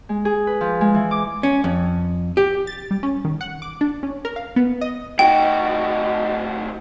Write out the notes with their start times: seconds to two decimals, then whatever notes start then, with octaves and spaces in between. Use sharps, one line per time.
0.09 G#3
0.25 G#4
0.47 B4
0.61 F3
0.81 G#3
0.94 E3
1.11 D6
1.43 C#4
1.64 F2
2.37 G4
2.67 A6
2.91 G3
3.03 C#4
3.25 D#3
3.41 F#5
3.62 D6
3.81 D4
4.03 C#4
4.25 A#4
4.36 F5
4.56 B3
4.81 D#5
5.19 A2 D#4 F#4 G5